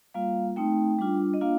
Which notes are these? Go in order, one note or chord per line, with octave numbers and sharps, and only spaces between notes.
G3 A#3 F4 F5
A3 C4 D#4 G5
G3 D4 F4
D#5
A#3 D4 F4 F5